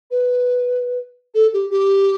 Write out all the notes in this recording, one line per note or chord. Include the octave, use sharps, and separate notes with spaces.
B4
A4
G4
G4